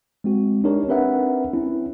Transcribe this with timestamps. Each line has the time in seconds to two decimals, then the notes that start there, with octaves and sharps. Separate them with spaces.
0.24 G#3 C4 F#4
0.64 D4 D#4 G4 A#4 C#5
0.88 C4 D4 A#4 B4 E5 F#5
1.53 C4 C#4 E4